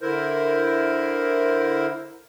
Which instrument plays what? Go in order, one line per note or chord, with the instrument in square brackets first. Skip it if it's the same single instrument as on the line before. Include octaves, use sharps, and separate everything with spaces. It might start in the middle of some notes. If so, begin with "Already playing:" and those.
[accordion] D3 E4 A#4 C5